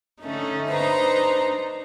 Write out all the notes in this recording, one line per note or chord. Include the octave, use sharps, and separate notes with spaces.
D3 A3 C#4 D#4
D4 D#4 B4 C5 A#5